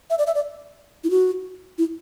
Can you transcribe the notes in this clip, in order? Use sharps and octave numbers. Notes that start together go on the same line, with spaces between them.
E5
D5
E5
D5
E4
F#4
E4